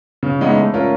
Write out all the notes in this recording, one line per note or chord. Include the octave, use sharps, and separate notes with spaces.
C#3
E3 G#3 B3 D#4
A3
C#4 F4 A#4